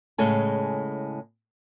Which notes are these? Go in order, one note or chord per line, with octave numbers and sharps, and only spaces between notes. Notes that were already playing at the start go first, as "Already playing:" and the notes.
A2 C#3 G#3 G#4 A4